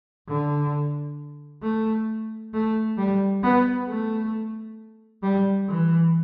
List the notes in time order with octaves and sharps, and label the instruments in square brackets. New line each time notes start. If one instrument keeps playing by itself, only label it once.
[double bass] D3
A3
A3
G3
B3
A3
G3
E3